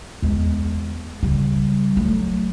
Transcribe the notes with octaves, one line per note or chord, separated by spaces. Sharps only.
E2 G#3
C#3 G3
F#3 A3